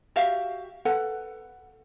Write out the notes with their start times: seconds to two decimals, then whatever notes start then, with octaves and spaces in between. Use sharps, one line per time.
0.16 F#4 G4 E5 F5
0.85 A4 B4 F#5